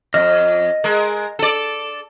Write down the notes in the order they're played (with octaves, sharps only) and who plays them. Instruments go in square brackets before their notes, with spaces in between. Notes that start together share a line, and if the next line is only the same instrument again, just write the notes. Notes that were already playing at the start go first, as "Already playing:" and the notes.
[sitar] F2 [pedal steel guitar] D#5 F6
[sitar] G#3 A#4
A4 D5